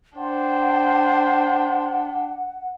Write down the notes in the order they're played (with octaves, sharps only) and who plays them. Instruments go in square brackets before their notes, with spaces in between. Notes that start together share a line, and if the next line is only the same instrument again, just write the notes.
[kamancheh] D4 G5 [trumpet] C5 [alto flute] F#5